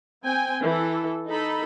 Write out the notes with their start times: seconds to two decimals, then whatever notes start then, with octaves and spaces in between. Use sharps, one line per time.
0.24 C4 G5 G#5
0.63 E3 A4
1.27 D#4 A4 B5